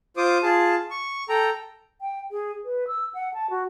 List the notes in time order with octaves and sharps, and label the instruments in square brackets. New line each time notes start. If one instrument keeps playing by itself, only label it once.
[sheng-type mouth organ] F4 C5 D6 D#6
F4 G#4 A5
C#6
A4 G5 A#5
[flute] G5
G#4
B4
E6
F#5
A5
F#4